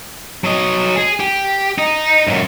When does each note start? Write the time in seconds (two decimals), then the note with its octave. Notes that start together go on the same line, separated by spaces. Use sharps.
0.44 F#3 D#5
0.96 G#4
1.20 G4
1.78 D#4
2.27 F#2 A#2